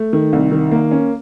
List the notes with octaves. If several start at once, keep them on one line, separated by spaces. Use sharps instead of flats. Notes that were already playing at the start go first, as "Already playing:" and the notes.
Already playing: A3
D#3
C2
D#3
A#3
C#4